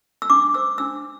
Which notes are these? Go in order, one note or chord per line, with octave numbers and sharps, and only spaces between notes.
E6
D4 D6
C5 E6
D4 E6